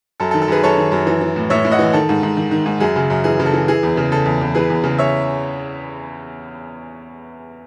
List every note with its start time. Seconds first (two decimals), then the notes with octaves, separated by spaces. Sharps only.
0.20 F#2 A4
0.31 A4
0.34 D#3
0.42 A4
0.48 F#2 G#4 B4
0.63 F#2 A4 C#5
0.77 D#3
0.92 F#2
1.07 E3
1.21 E3
1.36 A2
1.50 A2 C#5 E5
1.65 A2
1.71 D#5 F#5
1.79 E3
1.93 D#3 A4
2.09 G#2
2.23 G#2
2.37 D#3
2.51 D#3
2.66 G#2
2.80 F#2 G#4
2.96 C#3
3.10 F#2
3.24 E3 G#4
3.40 C#3
3.46 A4
3.54 E3
3.68 E3 G#4
3.83 E2
3.97 C#3
4.12 C#3 A4
4.26 E2
4.41 E2
4.55 E3 G#4 B4
4.70 E2
4.84 C#3
4.98 C#5 E5